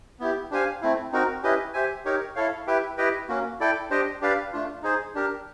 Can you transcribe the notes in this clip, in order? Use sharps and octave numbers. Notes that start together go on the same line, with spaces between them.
B3 E4 G4
D4 G4 C5 F5 G#5
A3 C4 E4
C4 D#4 F#4 A#4
C#4 E4 G4 B4 D#5
G4 C5 E5 G#5
D#4 G4 A#4 C#5
E4 A4 C#5 F5
E4 G4 B4 E5 G5
E4 G4 B4 D#5 G5
A#3 C#4 F#4
E4 A4 D5 G5
D4 G4 C5 D#5 G5
D4 G4 B4 D5 F5
A3 D4 F4
D#4 G#4 C5
D4 G4 A#4